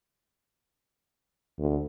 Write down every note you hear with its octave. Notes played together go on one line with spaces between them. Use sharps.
D2